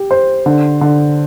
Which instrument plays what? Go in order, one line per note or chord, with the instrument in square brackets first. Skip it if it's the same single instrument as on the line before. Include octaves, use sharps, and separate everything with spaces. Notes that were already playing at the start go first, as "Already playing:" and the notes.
Already playing: [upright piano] G4
C5
D3
D3